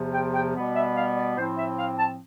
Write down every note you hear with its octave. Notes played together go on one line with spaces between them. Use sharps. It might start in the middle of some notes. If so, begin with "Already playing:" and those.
Already playing: E2 C3 F3
G5
G5
B2 G3 B3
E5
F5
D5
A2 F3 C4 C5
E5
F5
A5